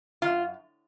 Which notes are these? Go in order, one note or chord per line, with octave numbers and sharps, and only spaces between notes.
D#3 F4
F#2